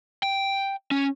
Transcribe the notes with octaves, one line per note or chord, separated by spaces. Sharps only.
G5
C#4